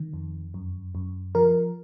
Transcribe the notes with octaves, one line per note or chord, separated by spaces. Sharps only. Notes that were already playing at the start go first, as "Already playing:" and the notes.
Already playing: D#3
F2
F#2
F#2
F3 A#4